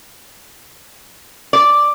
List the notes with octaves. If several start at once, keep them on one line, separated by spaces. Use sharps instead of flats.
D5